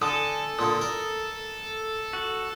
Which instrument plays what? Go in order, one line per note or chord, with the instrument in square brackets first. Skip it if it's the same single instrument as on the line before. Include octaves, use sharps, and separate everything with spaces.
[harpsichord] D3 [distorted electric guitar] A4 [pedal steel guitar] G#5 D#6
[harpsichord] A#2 D3 [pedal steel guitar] D#6
[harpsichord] A#4
[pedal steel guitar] F#4